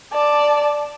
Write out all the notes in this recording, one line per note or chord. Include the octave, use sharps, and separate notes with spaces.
D5 A5